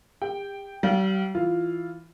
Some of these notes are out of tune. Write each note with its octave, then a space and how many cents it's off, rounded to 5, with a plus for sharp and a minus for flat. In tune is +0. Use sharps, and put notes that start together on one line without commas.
G4 +40 G5 +0
G3 -40 F5 -10
E3 +0 F4 -5